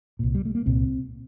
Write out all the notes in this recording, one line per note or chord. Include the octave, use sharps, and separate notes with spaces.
C2 A#2
G3
A3
A#3
C2 A#2 C4